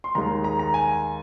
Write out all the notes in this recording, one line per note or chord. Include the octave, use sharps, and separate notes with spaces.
C6
D#2 D#3 G#3 A#5
A#5
A#5
G#5